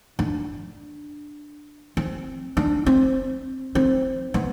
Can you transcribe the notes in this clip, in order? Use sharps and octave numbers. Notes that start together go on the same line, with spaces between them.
D4
C4
D4
C4
C4
B3